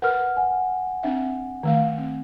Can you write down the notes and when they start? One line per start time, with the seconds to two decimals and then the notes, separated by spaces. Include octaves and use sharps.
0.02 A#4 B4 F#5 F6
0.37 F#5 G#5
1.03 C4 D4 E5
1.63 D#3 A3 F5
1.98 C4